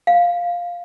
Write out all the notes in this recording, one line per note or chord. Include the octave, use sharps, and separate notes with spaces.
F5